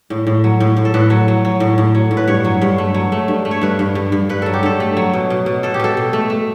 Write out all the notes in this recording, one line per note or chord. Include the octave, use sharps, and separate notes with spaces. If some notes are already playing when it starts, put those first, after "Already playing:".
A2
A2
F#3
A2
A2
A4
A2 B4
F#3
F#3
F#3
A2
A2
F#3
A2
B4
G2 C#5
F#3
G2
A3
F#3
A3
G2
A3
C#5
G2 B4
G2
G2
G2
G2 B4
F#3 A4
G4
G2 A4
A3
F#3
B2
B2
B2
B2 A4
G4
B2 A4
B2
A3
A3